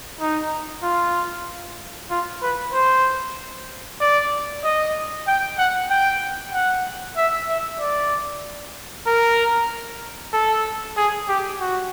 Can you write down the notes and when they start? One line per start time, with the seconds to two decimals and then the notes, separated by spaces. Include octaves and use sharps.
0.21 D#4
0.83 F4
2.10 F4
2.42 B4
2.74 C5
4.00 D5
4.64 D#5
5.27 G5
5.58 F#5
5.90 G5
6.53 F#5
7.17 E5
7.49 E5
7.80 D5
9.07 A#4
10.33 A4
10.97 G#4
11.28 G4
11.60 F#4